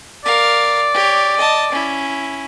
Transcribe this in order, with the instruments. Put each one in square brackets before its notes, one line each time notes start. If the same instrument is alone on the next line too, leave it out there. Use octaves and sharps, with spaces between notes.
[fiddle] A#4 F5 [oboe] D5
[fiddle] G4 C#5
D#5 A5
C#4 E4